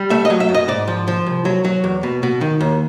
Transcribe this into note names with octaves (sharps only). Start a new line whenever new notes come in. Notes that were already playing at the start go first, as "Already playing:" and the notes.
Already playing: G3
A3 E5
D#5
F#3
E5
F#2
D#5
G#2 D5
F3
F3
C2
F#3
F#3
E2
B2
B2
D#3
D#2